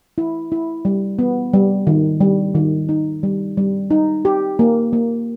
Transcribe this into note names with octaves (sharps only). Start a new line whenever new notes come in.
E4
E4
G3
B3
G3
D#3
G3
D#3
D#4
G3
G3
D#4
G4
A#3
A#3